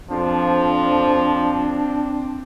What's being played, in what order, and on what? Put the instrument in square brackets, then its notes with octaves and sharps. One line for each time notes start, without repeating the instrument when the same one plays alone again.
[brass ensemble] F2 [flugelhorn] F3 [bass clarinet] C4 [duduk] D4